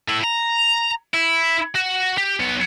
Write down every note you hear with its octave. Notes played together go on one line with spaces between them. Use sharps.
A2 E4
A#5
E4
F#4
G4
B1 B3